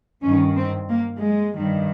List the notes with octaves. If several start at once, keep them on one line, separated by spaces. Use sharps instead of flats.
G2 D#3 C#4
C4
A#3
G#3
G2 D#3